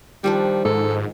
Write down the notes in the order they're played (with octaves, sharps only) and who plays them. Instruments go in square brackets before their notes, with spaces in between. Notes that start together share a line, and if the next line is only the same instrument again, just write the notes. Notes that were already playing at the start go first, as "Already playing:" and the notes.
[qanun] D#3 F3 D4 [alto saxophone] G3
[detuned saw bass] G#2 [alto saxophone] A4